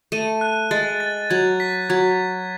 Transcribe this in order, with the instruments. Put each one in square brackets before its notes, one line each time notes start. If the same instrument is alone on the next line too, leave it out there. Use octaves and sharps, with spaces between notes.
[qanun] A3 [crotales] D#7
[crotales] F#6
[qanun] G#3 [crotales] A6
[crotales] A6
[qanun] F#3 [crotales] G#6
[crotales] B6
[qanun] F#3 [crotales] G#6